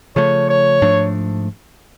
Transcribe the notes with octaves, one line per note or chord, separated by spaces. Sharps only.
C#3 F3 A3 C#5
C#5
G#2 F3 A3 D4